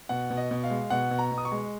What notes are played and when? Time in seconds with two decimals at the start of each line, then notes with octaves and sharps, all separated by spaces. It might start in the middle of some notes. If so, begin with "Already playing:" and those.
0.09 B2 F#5
0.31 B2
0.37 D#5
0.51 B2
0.64 F5
0.70 G#3
0.90 B2 F#5
1.11 B2
1.19 A#5
1.32 B2
1.38 D#6
1.45 C#6
1.52 G#3